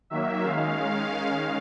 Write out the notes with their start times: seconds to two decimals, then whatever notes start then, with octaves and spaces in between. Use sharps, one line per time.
0.10 D#3 F#3 A#3 E5
0.43 D#3 G#3 C#4 F5